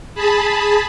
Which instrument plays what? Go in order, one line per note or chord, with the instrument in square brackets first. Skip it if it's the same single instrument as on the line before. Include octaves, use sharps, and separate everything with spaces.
[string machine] G#4 A5 B5